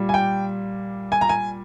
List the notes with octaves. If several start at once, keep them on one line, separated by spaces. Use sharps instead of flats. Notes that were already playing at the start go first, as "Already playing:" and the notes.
Already playing: A#2 G3
G#5
G5
G#5
A#5
G#5